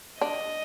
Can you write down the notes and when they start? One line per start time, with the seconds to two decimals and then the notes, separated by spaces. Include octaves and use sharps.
0.21 D4 D#5